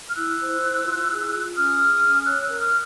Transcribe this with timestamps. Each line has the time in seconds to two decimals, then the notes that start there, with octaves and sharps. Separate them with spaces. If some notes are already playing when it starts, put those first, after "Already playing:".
0.09 F6
0.16 E4 E6 F#6
0.39 C5
0.62 E4
0.85 F4
1.09 G#4
1.33 F4
1.55 C#4 D#6 F6
1.79 G#4
2.02 C#4
2.25 C#5 E6 F#6
2.42 E6 F#6
2.48 A#4
2.60 D#6 F6